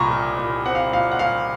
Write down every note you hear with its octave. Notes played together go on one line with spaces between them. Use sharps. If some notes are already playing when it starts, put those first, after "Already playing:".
Already playing: C2 A#2 A#5 C6 C#6
A#2
A#2
C4 F#5
F5
A#2 F5
F#5
A#2 F5